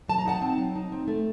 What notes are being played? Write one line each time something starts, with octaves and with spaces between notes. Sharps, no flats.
F#3 A5
A#5
D#4 F#5 A5
C4
F#3
D#4
C4
A3